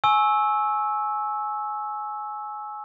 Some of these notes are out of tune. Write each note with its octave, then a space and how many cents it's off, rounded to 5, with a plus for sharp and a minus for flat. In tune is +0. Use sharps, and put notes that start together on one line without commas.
G#5 +20 C#6 -20 E6 -10